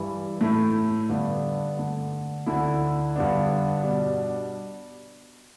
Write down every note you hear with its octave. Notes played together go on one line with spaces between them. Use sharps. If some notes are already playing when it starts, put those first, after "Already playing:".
Already playing: G2 E3 G3 E4
A2 A3 E4
G2 D3 B3 D4
D3 A3 D4
D2 D3 A3 E4
G2 D3 B3 D4
B2 G3 D4